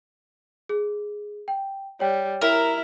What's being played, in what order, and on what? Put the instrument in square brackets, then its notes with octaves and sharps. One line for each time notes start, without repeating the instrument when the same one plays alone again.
[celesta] G#4
G5
[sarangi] G3 [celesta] C#5 G5
[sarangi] E4 [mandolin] A#4